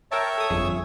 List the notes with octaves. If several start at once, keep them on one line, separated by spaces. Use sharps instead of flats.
A#4 C#5 E5 G5 A5
A4 D#6
G1 F2 G#4